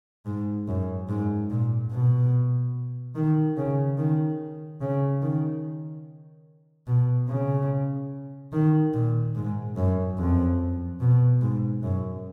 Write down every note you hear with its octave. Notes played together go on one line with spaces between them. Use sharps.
G#2
F#2
G#2
A#2
B2
D#3
C#3
D#3
C#3
D#3
B2
C#3
D#3
A#2
G#2
F#2
F2
B2
G#2
F#2